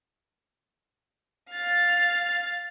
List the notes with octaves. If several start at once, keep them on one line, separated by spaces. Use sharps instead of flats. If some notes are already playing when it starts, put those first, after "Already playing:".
F5 A6